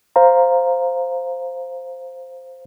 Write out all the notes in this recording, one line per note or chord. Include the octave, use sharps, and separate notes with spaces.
C5 F5 A#5